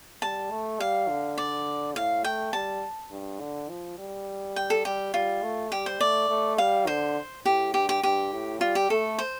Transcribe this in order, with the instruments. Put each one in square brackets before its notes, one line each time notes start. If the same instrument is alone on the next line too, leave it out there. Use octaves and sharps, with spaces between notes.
[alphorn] G3 [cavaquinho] A5
[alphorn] A3
[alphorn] G3 [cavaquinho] F5
[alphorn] D3
[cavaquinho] D5
[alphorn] A2 [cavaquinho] F5
[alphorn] A3 [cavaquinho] G5
[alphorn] G3 [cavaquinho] A5
[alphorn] G2
D3
F3
G3
[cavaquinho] G5
A4
[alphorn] G3 [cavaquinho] G4
[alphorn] G3 [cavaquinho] F4
[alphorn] A3
[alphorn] G3 [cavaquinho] G4
[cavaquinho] C5
[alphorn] A3 [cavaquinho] D5
[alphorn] A3
[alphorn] G3 [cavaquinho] F5
[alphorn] D3 [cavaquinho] C5
[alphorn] A2 [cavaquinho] G4
[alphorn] G2 [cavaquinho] G4
[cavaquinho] G4
[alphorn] G2 [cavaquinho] G4
[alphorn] A2
[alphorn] G3 [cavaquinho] F4
[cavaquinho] G4
[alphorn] A3 [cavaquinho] A4
[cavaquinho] C5